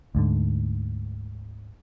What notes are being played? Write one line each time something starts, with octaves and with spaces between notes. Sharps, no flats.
D2 G#2 D3